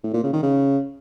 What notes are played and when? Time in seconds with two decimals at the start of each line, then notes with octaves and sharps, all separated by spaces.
0.03 A2
0.13 A#2
0.23 C#3
0.33 D#3
0.43 C#3